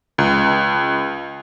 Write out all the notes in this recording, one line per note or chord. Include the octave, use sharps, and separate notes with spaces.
C#2